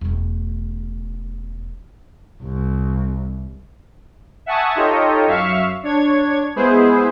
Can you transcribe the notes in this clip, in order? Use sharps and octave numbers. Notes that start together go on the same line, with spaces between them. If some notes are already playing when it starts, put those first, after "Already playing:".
E1 A3
C2
E5 F#5 G#5 A5 C#6 D#6
D#4 F4 G4 A4 C#5 D#5
F#2 E5 F5 C#6
D4 C#5 G#6
G#3 B3 E4 G#4 C5